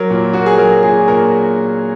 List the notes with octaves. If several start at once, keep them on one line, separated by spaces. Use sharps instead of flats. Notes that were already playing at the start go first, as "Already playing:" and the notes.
Already playing: F#3 A#4
A#2
A#3 F#4
G#4
F#3 A#4
A#2 G#4
A#2 A#4